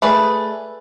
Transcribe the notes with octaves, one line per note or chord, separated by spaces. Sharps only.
A3 G#4 B4 D5